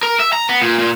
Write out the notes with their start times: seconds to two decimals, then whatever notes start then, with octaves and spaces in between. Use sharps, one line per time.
0.03 A#4
0.20 E5
0.33 A#5
0.49 B3
0.62 A#2
0.79 A#2